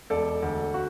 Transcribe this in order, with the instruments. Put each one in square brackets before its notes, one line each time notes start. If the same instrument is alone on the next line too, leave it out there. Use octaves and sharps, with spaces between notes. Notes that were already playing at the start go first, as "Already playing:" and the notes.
[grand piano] E1 A4 D5
D2
F#4